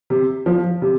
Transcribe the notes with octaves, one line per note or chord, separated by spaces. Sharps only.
C3
F3
C3